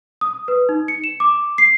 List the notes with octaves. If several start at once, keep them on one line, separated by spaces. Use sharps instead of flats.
D#6
B4
D#4
C#7
E7
D6
C7